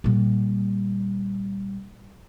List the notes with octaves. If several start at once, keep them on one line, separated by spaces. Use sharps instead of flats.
A#2 G3